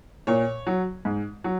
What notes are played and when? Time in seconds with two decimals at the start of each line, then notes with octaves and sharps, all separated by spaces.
0.27 A#2 C#5
0.67 F#3
1.05 G#2
1.44 F#3